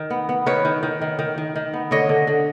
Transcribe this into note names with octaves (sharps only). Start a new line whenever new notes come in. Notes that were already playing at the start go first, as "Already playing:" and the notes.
Already playing: D#3
B3
B3
D#3 B4 C#5
D#3
D#3
D#3
D#3
D#3
D#3
B3
D3 C#5 D#5
D3
D3